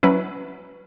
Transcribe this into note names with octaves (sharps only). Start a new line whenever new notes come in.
F#3 C#4 E4 B4